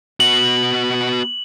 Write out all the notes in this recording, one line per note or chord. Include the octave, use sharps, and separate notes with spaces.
B3 F#4 F#7